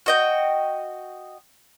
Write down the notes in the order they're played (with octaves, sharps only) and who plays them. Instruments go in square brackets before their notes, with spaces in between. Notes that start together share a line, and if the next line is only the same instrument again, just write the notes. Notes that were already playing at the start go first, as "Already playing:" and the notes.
[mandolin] F#4 D#5 G5